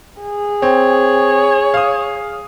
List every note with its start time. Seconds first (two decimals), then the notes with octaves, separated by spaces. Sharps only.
0.22 G#4
0.62 C4 C#5
1.74 F5 D#6